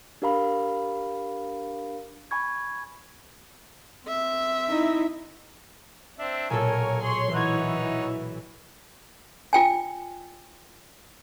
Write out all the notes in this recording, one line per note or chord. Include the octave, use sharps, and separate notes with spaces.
D4 G4 A#4 F5 A#5 B5
G#5 B5 C#6 G#6
C4 E5
D#4 E4
C4 D4 E5
B1 A#2 A4 A#4 C#5 G#5
G#4 C#5 C6
E3 D#4 C#5 F#5 F#6 G#6
F4 G5 G#5